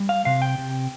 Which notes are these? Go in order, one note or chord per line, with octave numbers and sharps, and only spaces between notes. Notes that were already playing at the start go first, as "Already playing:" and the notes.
Already playing: G3
F5
C3 F5
G5
C3